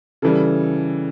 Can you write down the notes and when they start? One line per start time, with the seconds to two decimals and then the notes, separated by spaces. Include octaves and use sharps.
0.22 C#3 E3 G3 A4